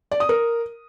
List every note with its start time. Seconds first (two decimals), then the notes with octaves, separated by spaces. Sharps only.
0.11 D5
0.20 D#6
0.29 A#4